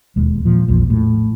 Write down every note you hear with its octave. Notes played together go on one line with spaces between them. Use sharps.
E1 D#2 G#3
A#2 F3
A#1 E2 F3 A#3
A2